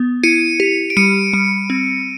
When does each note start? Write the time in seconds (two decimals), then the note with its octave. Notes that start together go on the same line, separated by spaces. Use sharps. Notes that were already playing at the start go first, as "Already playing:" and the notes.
Already playing: B3
0.23 E4 C#7 D#7
0.60 G4
0.90 D7
0.97 G3 C#7 D#7
1.33 G3
1.70 C4